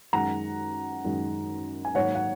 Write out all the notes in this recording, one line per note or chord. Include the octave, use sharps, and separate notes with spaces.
F#2 D#3 G#3 F#5 A#5
F#2 D#3 G#3
G#5
G#2 D#3 F#3 A#3 C#5 F#5
F#5